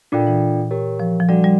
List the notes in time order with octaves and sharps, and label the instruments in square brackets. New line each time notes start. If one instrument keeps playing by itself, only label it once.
[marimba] A#2 [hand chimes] D4 F4 A4 D5 G5
[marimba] E3
[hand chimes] G4 A#4 C#5
[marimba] F3
F3
[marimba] G3 [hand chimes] D4 F#4 A4 D5 F#5
[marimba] G3